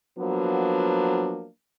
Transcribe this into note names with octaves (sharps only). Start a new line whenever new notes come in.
F3 F#3 A#3 B3 D4